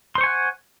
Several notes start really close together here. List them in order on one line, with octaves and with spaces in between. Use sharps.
C6 C5 C#6 G#5 F#5